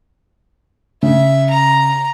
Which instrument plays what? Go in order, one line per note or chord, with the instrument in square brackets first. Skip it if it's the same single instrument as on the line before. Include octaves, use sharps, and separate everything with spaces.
[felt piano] C#3 [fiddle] E5
[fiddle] A#5